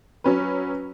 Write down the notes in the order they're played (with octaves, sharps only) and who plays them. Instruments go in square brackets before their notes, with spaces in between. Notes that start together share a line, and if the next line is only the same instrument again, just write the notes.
[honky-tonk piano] F#3 C#4 B4